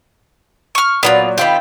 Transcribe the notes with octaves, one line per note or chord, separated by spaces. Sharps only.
C#6 F6
A#2 F#3 B3 D4 F4
D#3 C4 F4 G4 B5